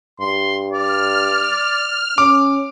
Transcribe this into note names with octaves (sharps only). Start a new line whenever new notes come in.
G2 C6
D5 F6
C#4 D6